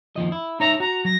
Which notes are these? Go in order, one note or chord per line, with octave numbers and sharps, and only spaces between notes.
D#2 F3 D#5
E4
D#4 C#5 E5 A#5
F#4 A#5
F#3 A#6